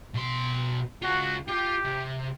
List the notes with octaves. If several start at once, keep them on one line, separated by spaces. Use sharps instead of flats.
B2 C6
C#2 F4 F#4
F4 G4
C3